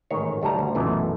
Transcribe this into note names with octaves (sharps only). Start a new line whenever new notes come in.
A1 G#2 D#3 C#5
D2 G3 A3 A4 A#5
D2
B1 F#2 A#2 E3 A3